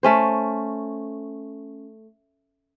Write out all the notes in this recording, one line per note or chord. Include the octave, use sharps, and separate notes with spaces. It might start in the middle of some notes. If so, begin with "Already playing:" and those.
A3 C#4 C5